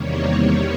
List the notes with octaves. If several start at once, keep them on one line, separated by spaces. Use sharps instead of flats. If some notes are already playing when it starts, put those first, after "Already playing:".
Already playing: E2 C3 D#3 G3 A#3 C#5